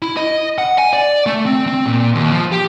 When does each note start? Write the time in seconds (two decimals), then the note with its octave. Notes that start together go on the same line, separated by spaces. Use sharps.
0.02 E4
0.17 D#5
0.58 F#5
0.78 G#5
0.93 D5
1.26 A3
1.46 C4
1.67 C4
1.86 A#2
2.15 D#2
2.31 F3
2.52 G4